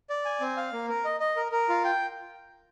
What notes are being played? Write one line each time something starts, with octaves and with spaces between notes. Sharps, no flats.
D5
G#5
C4
F5
A#3
A#4
D#5
D#5
A#4
A#4
F4
G5